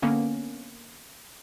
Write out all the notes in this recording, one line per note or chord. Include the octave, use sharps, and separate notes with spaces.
D3 A#3 B3 C#4